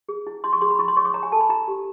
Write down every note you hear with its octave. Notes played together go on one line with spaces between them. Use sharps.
G#4
E4
E4 C6
C#6
G#4 C6
B5
E4 C#6
C6
C#5 C#6
D6
C#5 A#5
G#5
A4 A5
B5
E4 A#5
G4